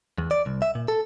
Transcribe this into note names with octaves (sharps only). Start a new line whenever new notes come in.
E2
D5
C2
E5
A#2
A4